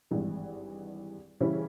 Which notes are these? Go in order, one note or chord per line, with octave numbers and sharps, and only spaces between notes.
G#1 G2 E3 G#3
C#3 E3 G3 C#4 E4